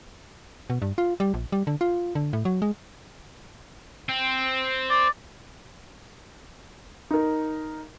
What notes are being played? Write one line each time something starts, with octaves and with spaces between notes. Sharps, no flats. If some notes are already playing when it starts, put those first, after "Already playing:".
B2
G2
F4
G3
A#1
G3
D3
F4
D3
A2
F#3
G#3
C4
D5
D#4 A#4